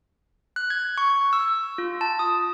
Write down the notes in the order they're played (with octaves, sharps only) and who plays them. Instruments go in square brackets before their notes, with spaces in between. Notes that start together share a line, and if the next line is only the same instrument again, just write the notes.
[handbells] F#6
G#6
C#6
E6
F4
A5
D#6